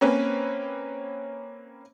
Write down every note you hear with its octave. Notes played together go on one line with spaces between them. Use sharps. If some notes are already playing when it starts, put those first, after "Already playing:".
A#3 C4 C#4 B4